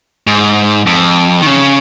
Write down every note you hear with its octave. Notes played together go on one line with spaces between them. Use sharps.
G#2
F2
D#3
C#3